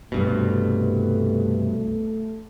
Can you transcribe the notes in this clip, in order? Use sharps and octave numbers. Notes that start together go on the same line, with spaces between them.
C2 G2 B2 A3